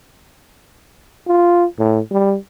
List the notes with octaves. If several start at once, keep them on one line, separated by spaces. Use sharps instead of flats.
F4
A2
G3